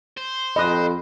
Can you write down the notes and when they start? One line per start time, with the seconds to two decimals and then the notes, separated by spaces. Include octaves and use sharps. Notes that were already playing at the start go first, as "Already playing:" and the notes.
0.18 C5
0.56 F2 D#5 B5 D#6 F#6